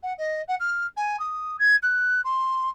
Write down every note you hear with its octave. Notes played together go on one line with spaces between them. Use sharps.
F#5
D#5
F#5
F6
G#5
D#6
G#6
F#6
C6